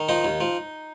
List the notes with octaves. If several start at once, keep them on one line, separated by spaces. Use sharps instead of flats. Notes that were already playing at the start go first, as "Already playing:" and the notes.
Already playing: D#3
F3 D#4
D#2
F3